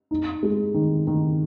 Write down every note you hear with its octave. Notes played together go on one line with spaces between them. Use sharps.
D#4
G#3
D#3
D#3